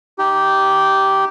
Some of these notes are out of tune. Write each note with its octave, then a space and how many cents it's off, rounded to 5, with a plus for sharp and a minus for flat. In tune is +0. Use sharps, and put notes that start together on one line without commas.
D#4 +0 G4 -10